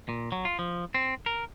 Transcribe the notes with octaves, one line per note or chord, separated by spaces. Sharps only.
A#2
F#3
F4
F3
C4
A#4